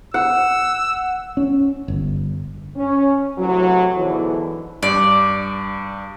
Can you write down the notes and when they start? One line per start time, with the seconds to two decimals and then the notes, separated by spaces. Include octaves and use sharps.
0.14 F#5 E6
1.37 C#4
1.88 G1
2.76 C#4
3.38 A2 C3 E3 F#3
3.96 G#2 B2 D3 E3
4.83 G2 D5